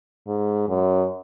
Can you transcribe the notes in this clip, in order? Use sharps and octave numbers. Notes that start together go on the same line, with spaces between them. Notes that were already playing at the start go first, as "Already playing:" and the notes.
G#2
F#2